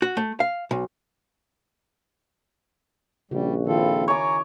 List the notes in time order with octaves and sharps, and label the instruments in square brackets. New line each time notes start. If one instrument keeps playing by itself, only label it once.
[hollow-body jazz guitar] F#4
A3
F5
B1
[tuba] A#1 [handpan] C#3 F#4 [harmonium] G3
[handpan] D#3 E4 [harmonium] C4 F4 A4
[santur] C#5 D6 [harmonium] G#5 A#5